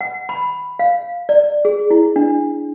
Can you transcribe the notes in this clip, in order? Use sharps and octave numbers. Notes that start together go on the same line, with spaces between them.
F#5
B5
F5
D5
G#4
E4
D4